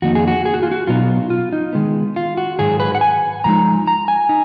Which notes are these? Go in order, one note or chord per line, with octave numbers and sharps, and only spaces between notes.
F2 D#3 A#3 D#4 F#4
G#4
F#4
G#4
F#4
F4
F#4
B2 F#3 B3 D#4 F4
F4
D#4
D#3 G#3 B3
F4
F#4
G#2 D#3 F#3 G#4
B4
F#5
G#5
F#2 F3 G#3 D#4 A#5
A#5
G#5
D#4